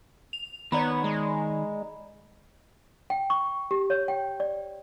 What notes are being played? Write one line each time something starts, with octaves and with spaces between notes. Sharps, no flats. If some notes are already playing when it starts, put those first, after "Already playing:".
F7
D#3 B3 C#5 D5 A#5 B5
G#3
G5
C#6
G4
C#5
G5
D5